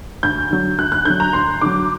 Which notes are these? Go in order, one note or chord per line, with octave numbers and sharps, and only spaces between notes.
D2 G6
D3 F#3
D2 F#6
F#6
D3 F#3 G6
A#5
D2 C6
D3 F#3 D6